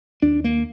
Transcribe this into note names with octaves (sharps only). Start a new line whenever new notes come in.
D#2 D4
A#3